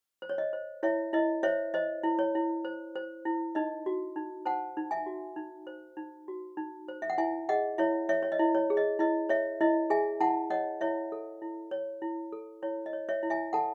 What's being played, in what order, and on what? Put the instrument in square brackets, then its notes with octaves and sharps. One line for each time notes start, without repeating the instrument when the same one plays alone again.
[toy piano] C5
C#5
D#5
C5
E4 C#5 E5
E4 D#5
C5 C#5 E5
C5 D#5
E4
C#5
E4
C5
C5
E4
D#4 D#5
F#4
D#4
C5 F#5 A5
D#4
E5 G#5
F#4
D#4
C5
D#4
F#4
D#4
C5
E5
F#5
E4 E5 G#5
G#4 D#5 F#5
E4 C#5 E5
C#5 E5
C#5
D#5
E4
C#5
G#4
D#5
E4 D#5
C#5 E5
E4 D#5
G#4 E5 G#5
E4 F#5 A5
C#5 D#5 F#5
E4 C#5 E5
A4
E4
C#5
E4
A4
E4 C#5
D#5
C#5
C#5 E5
E4
E5 G#5
A4 F#5 A5